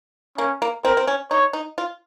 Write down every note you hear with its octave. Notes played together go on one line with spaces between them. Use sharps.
A#3 C#4
A#3
C4 A#4
C4
C#4
D#4 C#5
D#4
F4